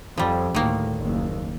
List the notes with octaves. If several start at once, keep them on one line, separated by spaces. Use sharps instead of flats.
F2 F3 G3
D2 A2 D#3 A#3
F#1 D#2